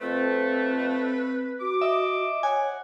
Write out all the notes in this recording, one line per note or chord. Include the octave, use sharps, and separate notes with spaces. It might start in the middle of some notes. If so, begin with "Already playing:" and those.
F2 A3 C4 B4
F#4 D6
D#5 E5
C#5 F#5 G#5